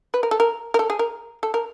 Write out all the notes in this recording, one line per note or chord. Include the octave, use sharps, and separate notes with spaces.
B4
A#4
A4
A#4
A#4
A4
G#4
A#4
A4
A#4